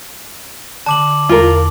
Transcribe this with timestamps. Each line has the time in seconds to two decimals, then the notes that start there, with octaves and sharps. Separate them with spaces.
0.86 D3 A5 D6 F#7
1.29 E2 F4 A#4